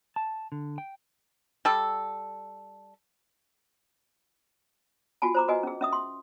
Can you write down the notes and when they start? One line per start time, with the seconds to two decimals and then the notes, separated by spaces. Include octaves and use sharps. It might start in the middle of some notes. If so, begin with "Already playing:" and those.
0.16 A5
0.52 D3
0.78 G5
1.65 G3 A4
5.22 F4 F#4 G#5 A5
5.35 C5 A#5 D6
5.48 F#4 B4 D#5 G#5
5.63 C#4 G#4
5.81 C#4 E5 D#6
5.93 C6